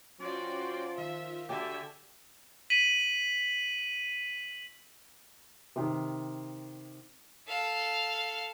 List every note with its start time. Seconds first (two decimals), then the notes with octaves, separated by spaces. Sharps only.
0.20 F3 C#4 F#4 D5 G5 C6
0.97 D#3 F4 E5
1.49 D3 D4 F#4 G4 E5 G#5
2.70 B6 D#7 F#7
5.76 C3 D#3
7.48 A4 F5